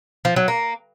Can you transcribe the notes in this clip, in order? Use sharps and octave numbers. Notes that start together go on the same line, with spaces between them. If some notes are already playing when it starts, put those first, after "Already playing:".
F3
F#3
A#3